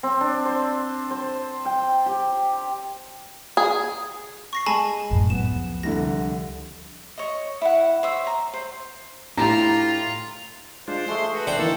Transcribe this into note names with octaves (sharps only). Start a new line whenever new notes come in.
C4
D4
C5
C5
G5
G4
G#4
C#6 A#6 C7
G#3 G#5 A5 B5
F#2 A2
C#2 F3 B3 E7
C2 D3 A#6
C#5 D#5
E4 F#5
C5 C#5 E5 D#6
A#5
C5
A2 D4 E4 F4 G4 A#5
G#3 D4 F4 C5
G#3 A3 G#4 C6
F#4 B4
D4 C5 G5
D#3 E3 A#3 A4